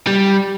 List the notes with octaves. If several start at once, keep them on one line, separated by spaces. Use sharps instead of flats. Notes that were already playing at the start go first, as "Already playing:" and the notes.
G3